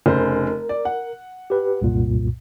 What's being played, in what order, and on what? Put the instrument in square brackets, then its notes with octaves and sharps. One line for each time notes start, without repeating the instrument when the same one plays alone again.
[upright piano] F1 C#3 C5 [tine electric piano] A#4
[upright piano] D5
F#5
[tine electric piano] G4 B4
C2 F#2 A#2